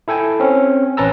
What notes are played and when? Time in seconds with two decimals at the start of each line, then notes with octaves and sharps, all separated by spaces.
0.08 E4 A4 G5 G#5
0.40 C4 C#4
0.97 A1 C#4 B4 A5 A#5 E6